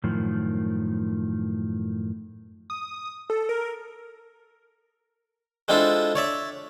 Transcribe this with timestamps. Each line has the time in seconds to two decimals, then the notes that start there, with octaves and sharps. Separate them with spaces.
0.04 F#2 A2 D#3 F3
2.70 D#6
3.30 A4
3.49 A#4
5.68 G#3 C4 D4 E4 F4 A4
6.15 C#5 D5 E5